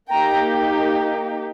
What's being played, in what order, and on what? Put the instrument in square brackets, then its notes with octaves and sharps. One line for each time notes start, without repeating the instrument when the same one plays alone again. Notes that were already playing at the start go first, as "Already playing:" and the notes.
[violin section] A#3 D#4 G4 G5 A#5